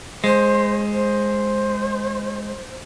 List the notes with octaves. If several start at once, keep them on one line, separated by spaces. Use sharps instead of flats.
G#3 C5
C5